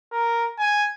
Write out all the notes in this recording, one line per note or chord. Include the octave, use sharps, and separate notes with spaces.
A#4
G#5